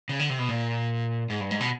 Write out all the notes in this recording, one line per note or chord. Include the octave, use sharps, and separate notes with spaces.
C#3
D3
C3
B2
A#2
G#2
G2
G#2
B2